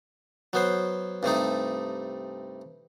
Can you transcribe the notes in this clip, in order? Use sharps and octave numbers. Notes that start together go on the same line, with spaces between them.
F#3 B3 C5
G2 C3 A3 D#4